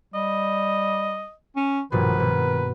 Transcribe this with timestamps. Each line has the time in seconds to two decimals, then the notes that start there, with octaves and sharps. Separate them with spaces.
0.14 G3 D#5
1.56 C#4
1.92 A#1 G2 B2 D#3 B4
2.20 B2